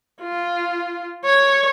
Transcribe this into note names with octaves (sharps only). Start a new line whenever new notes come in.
F4
C#5